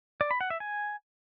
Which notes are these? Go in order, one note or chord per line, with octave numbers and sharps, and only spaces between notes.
D5
B5
F#5
E5
G#5